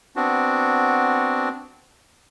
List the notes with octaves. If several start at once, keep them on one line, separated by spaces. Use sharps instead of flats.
B3 C4 D4 F#4